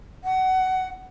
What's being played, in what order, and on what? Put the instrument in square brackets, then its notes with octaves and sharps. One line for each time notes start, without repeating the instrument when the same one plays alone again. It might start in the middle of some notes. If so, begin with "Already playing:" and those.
[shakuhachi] F#5